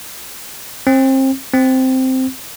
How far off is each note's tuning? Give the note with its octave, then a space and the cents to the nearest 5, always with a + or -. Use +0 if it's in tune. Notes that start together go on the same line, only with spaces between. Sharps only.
C4 +30
C4 -5